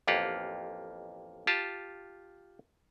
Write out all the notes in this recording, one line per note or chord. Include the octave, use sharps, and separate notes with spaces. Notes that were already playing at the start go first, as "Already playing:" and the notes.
A1 F2 A#3 F4 G4 F#5
F4 G4 A5